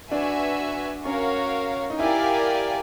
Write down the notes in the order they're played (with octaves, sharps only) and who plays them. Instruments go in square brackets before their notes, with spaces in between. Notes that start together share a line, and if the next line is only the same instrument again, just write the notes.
[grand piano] D4 [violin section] F#4 B4 E5 G#5
[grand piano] C#4 [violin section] F#4 A#4 C#5 F5
[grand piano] D#4
[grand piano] E4 [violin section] G4 A#4 D5 F5 G#5